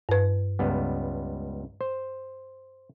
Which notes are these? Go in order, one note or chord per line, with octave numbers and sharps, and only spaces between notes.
G2 B4
C#2 G3 B3
C5